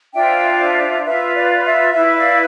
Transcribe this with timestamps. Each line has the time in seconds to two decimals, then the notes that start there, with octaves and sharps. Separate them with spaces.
0.13 D4 F4 C5 E5 G5
0.59 E5
1.04 F4 B4 E5
1.35 D5
1.65 E5
1.94 E4 B4 E5
2.17 D5 F5